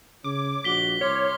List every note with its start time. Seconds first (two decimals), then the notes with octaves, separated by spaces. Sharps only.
0.24 C#3 C#5 D6
0.64 A#1 F#4 B6 G7
1.01 C2 C#5 C6 D6 F6